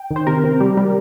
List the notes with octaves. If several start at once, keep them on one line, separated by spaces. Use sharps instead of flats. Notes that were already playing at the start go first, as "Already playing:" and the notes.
Already playing: G5
D#3
C5
C3 A#4
C3
G3
G3